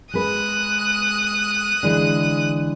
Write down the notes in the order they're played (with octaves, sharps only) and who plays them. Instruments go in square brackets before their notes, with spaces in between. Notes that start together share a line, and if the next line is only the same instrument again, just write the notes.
[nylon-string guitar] G#3 B4 [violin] D#6 F#6
[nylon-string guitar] D3 E3 G#3